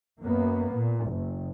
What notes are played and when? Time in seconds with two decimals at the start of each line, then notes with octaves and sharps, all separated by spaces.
0.22 F#2 A#3 B3
0.73 A#2
1.08 F#1